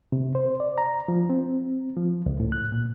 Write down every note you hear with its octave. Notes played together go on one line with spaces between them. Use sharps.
C3
C5
D5
A#5
F3
C4
F3
C#2
A2
F#6
A#2